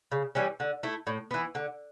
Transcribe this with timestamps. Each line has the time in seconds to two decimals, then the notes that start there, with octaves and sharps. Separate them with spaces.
0.12 C#3
0.35 E3 G3 C#4
0.60 D3
0.83 A3 E4
1.07 A2
1.31 E3 B3
1.55 D3